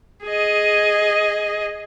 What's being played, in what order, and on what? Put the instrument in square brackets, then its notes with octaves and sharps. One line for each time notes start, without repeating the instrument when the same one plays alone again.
[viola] G#4 D#5